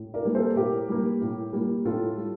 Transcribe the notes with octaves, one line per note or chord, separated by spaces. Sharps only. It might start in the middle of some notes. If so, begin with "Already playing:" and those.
Already playing: A2
A#4 D5
G3 A#3
A4 C5
A2 G4 A#4
G3 A#3
A2
G3 A#3
A2 F4 A4
G3